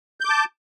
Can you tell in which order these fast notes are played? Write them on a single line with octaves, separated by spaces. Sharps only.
G6 D6 A5